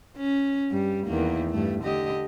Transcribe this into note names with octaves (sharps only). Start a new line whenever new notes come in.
C#4
G2 G3
E2 D#3 A#3
G2 A3
D3 G4 D#5